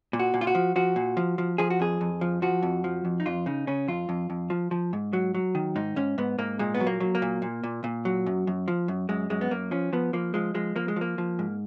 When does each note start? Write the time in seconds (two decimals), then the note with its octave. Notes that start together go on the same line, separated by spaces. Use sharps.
0.13 A#2
0.19 F#4
0.34 A#2
0.41 F4
0.47 F#4
0.55 F3
0.76 F3 F#4
0.96 A#2
1.17 F3
1.38 F3
1.58 F3 G#4
1.70 F#4
1.80 F2 G#4
2.01 F2
2.21 F3
2.42 F3 F#4
2.63 F2
2.84 F3
3.05 F2
3.20 D#4
3.26 F2 F4
3.46 C#3 D#4
3.67 C#3 C#4
3.88 F2 F4
4.09 F2
4.30 F2
4.50 F3
4.71 F3
4.93 G#2
5.13 F#3
5.34 F#3
5.55 D#3
5.76 G#2 D#4
5.96 G#2 C#4
6.18 G#2 B3
6.38 G#2 A#3
6.59 A#2 G#3
6.74 B3
6.80 F#3
6.87 A#3
7.00 F#3
7.15 A#3
7.22 A#2
7.42 A#2
7.64 A#2
7.84 A#2
8.05 F#3
8.26 F#2
8.47 F#2
8.68 F3
8.88 F#2
9.09 F#2 G#3
9.30 F#2 G#3
9.41 B3
9.51 F#2 A#3
9.71 F3 C#4
9.93 F3 B3
10.13 F3 A#3
10.34 F3 G#3
10.54 F3 G#3
10.76 F3 A#3
10.88 G#3
10.96 F3 A#3
11.18 F3
11.39 G#2